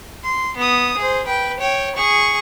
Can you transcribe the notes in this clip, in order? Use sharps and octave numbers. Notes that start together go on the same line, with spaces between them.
C6
B3 D#6
G#4 C5
B4 G5
C#5 G5
G#4 C#6